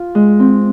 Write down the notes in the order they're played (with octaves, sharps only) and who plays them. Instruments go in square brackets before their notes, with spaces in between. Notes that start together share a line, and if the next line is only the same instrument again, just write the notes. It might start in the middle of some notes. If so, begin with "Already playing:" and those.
Already playing: [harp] F4
G#3
C4